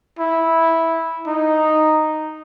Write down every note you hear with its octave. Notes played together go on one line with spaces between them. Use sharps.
E4
D#4